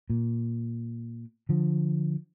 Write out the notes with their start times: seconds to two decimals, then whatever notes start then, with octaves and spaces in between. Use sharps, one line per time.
0.10 A#2
1.49 D3 F3